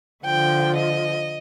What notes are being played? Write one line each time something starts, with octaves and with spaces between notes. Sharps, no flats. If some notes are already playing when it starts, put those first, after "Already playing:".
D3 F3 G5
D#5